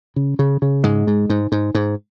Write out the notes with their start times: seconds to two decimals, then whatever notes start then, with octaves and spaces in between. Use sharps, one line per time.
0.16 C#3
0.39 C#3
0.62 C#3
0.84 G#2 G#3
1.07 G#2
1.30 G#2
1.52 G#2
1.75 G#2